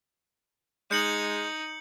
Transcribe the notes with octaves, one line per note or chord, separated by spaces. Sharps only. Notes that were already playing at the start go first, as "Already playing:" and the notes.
G#3 D#4 G6 C#7 F#7